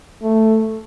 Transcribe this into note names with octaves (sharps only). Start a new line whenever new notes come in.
A3